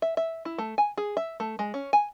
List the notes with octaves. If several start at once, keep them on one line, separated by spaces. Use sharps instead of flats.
E5
E5
E4
A3
G#5
G#4
E5
A3
G#3
C#4
G#5